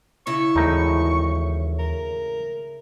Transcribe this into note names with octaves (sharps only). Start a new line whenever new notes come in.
C#3 E4 E5 C#6
G#1 D#2 A2 E3 D#4
A#4